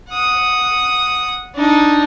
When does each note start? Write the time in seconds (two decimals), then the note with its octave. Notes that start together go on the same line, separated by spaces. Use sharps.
0.12 F#5 D#6
1.55 D4 D#4